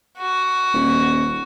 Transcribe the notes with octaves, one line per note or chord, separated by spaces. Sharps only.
F#4
D#1